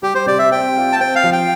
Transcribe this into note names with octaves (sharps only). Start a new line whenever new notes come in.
G3 G4
C5
C3 D5
E5
C4 G5
F4
A5
C4 G5
F5
F3
G5